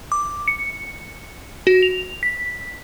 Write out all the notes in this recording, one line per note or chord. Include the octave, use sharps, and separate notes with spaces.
D6
C#7
F#4
F7
B6